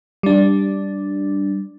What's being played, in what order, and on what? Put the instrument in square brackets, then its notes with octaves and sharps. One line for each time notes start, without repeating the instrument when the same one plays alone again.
[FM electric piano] G3 D4